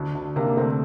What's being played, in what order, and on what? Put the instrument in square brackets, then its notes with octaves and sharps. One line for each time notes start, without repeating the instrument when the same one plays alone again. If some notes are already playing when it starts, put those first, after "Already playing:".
Already playing: [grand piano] D2 [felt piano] D4 F#4
[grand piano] D2
[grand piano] C3 [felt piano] A#3 D4
[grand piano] D2 [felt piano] A3 C4